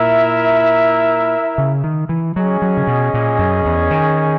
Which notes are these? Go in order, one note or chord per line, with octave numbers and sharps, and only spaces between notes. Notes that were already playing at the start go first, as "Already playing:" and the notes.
Already playing: A#2 E4 A#4 E5
C#3
D#3
E3
F#3 C#4 G#4 D#5
F#3
C#3
B2
A#2
F#2
E2
D#3